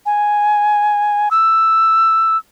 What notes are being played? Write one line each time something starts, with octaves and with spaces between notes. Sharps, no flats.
G#5
E6